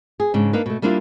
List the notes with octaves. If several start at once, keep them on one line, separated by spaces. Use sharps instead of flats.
G#4
G#2 C#3 D4
A#3 D4 D#4 B4
B2 A3
G3 A#3 D4 E4 F4